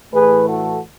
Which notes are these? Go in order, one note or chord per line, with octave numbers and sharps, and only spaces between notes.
A2 E3 A3 G#4 B4
F#4 A4